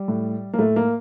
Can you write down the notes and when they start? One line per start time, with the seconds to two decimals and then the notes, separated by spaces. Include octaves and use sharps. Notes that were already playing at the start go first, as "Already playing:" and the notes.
Already playing: G3
0.08 A2
0.54 A#3
0.58 A2 A3
0.76 A#3